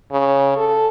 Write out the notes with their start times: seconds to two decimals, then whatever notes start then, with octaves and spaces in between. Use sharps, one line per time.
0.12 C#3
0.57 A4